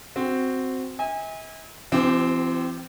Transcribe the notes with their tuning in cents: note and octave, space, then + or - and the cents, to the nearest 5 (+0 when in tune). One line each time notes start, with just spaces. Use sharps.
C4 -5 F#4 +0
E5 -45 G#5 -30
E3 +45 C4 -15 G4 -25